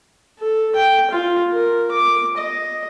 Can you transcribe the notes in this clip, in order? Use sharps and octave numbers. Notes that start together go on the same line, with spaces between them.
A4
G5
F4
A#4
D6
D#5